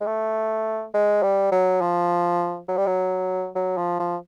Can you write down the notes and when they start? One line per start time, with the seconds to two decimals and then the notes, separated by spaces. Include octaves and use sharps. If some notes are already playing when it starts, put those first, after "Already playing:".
0.01 G#3
0.06 A3
0.94 G#3
1.23 G3
1.52 F#3
1.81 F3
2.68 F#3
2.77 G3
2.87 F#3
3.55 F#3
3.77 F3
4.00 F3